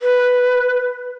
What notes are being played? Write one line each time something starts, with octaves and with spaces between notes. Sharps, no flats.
B4